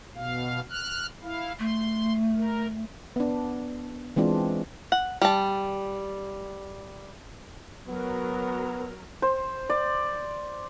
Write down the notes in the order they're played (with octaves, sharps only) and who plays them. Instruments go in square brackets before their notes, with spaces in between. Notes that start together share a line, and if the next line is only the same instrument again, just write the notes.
[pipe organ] B2 F5
F6 F#6
E4 F5
[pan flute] A3 [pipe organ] C6
[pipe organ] A#4
[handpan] B3 D4
E3 G#3 C4 D4 F4
[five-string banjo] F#5
G3 A5
[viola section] F#3 A#4 [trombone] B3
[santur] C5
D5